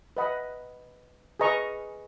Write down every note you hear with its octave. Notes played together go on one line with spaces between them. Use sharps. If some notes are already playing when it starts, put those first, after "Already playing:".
B4 D#5 F#5 B5
G#4 B4 D#5 A#5 C#6